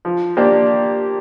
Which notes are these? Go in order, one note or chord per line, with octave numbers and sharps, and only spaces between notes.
F3
A#3 D4 G4 C5